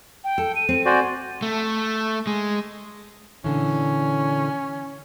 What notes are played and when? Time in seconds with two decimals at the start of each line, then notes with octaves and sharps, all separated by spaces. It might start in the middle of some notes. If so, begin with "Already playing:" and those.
0.24 G5
0.38 A4
0.56 D#7
0.69 C4
0.86 F#4 C5 D5 G#5
1.42 A3
2.27 G#3
3.44 A#2 D3 E3 C#4